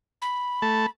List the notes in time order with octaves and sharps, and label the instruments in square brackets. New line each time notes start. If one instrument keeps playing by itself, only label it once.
[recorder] B5
[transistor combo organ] A3 A5